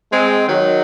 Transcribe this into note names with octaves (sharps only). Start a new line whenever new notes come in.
G#3 C4
D#3 F#3